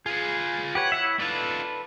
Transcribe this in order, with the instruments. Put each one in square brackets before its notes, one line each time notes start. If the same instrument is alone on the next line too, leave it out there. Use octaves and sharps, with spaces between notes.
[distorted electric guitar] F4 B4 [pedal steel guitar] G#4
[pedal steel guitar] G4 B4 C#5 [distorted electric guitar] F#5
[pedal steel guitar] E4 C#5 E5
[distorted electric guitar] D#4 F4 [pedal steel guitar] A4 B4 D5